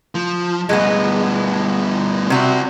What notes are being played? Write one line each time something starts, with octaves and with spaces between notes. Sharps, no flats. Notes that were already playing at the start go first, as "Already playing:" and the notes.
F3
G2 B2 G#3 B3
C3 C4 F#4 D5